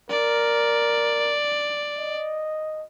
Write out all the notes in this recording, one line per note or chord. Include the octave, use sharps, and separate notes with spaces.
A#4 D5
D#5